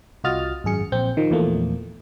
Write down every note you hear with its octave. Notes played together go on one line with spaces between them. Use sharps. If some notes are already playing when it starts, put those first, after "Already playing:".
C2 F4 F#4 D#5 F6 A6
G#1 F#2 G#4 C#7
A#1 C4 G6
D#3 F3
E2 A#2 F3 A3 A#3